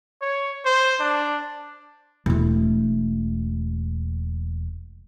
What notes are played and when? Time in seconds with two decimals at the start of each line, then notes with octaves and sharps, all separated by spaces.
0.21 C#5
0.65 C5
1.00 D4
2.26 E1 A3